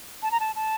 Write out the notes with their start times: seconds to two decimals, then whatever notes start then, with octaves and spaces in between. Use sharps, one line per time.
0.23 A5
0.31 A#5
0.40 A5
0.56 A5